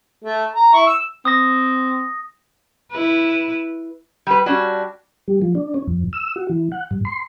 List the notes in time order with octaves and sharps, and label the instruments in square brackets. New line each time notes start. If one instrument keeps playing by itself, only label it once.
[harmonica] A3
A#5
E4 C#6
E6
[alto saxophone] C4 [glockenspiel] D#6 A#6
[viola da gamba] E4 B4
[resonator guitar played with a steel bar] G3 B4
G3 C#4 D4 F#4
[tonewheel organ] G3
F3
D4
C#4
F2
E6
F#4
E3
F#5
G2
C6